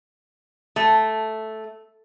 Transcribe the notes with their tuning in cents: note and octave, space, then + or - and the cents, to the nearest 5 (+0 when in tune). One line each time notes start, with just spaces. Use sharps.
A3 -5